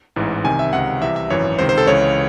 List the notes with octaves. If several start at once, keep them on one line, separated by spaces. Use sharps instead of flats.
A1 G#2 E3
C2 C3 D#3 G#5
E5
C#2 C3 D#3 F#5
C2 C3 E3 E5
E5
G#1 F#2 E3 C#5
C#2 C3 D#3 C5
C5
A4
C#2 C#3 E3 C#5